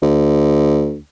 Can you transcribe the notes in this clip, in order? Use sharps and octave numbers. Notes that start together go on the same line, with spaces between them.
D2